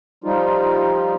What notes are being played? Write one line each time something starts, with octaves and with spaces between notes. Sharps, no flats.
F3 G3 D#4 F4